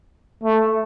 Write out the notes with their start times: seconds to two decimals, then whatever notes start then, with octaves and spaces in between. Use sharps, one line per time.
0.44 A3